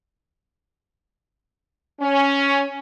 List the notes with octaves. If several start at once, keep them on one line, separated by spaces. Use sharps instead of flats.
C#4